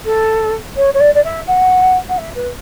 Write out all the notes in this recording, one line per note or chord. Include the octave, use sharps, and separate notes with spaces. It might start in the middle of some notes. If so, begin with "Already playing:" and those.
A4
C#5
C#5
D5
D5
E5
F#5
F#5
E5
B4